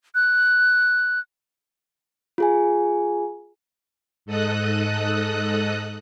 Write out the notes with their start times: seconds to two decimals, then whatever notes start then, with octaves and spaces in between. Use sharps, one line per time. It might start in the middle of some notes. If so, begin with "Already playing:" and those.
0.15 F#6
2.38 F4 G#4 G#5
4.26 G#2 A4 D#5 D#6 F#6